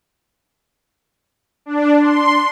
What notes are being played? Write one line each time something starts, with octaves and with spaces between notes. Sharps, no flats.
D4
C6